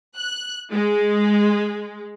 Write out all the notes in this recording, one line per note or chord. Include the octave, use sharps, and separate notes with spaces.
F#6
G#3